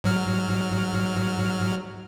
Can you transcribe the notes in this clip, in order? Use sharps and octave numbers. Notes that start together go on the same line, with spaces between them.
G#2 F#3 F6